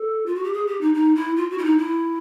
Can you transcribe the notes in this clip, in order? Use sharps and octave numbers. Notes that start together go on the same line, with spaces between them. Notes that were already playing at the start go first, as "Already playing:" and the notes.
Already playing: A4
F4
F#4
G4
G#4
G4
D#4
D#4
E4
F4
F#4
E4
D#4
E4